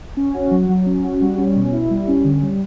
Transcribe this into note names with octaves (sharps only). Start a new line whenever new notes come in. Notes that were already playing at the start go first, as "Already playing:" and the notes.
C#4
F#4
F#3
F#3
C#4
F#4
G3
C#4
B2
E4
G3
C#4
D3
G3